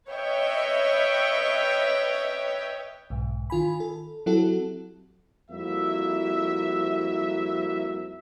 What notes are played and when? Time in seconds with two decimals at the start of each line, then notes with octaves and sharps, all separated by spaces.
0.10 B4 C#5 D#5 E5 G5
3.10 B1 G#2
3.50 D#3 F4 G#5 B5
3.80 A4
4.26 F#3 C4 E4 F#4 G4 A4
5.51 F2 G3 A#3 E4 F#4 E5